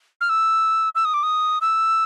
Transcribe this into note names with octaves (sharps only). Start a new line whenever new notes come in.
F6
E6
E6
D#6
D6
D#6
E6